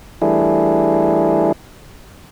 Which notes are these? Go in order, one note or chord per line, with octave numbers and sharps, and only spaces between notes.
E3 G3 A3 D4 E4 G#4